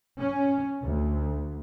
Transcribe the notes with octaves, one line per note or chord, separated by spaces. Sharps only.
C#4
D2